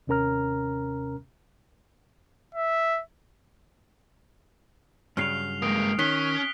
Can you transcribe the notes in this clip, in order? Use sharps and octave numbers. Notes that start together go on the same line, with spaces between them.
D#2 C3 C#4 A#4 A#5 F6
E5
G2 C#3 F#3 F6 C7 F7
G#3 A#3 D#6 D7
D#3 C#4 F#6 B6 G7